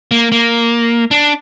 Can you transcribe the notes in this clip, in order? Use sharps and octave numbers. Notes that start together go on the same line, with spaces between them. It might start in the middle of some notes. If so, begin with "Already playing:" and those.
A#3
A#3
D4